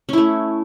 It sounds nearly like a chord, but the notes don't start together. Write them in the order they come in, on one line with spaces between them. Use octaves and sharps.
C#4 E4 A3